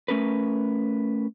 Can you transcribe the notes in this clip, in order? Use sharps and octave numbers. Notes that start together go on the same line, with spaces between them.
A3 C#4 A#4 B4